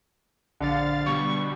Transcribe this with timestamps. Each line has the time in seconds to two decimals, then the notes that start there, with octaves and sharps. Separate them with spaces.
0.60 A#1 D3 F5 A6
1.06 B2 G3 C#6